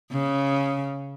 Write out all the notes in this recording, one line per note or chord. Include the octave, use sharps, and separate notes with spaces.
C#3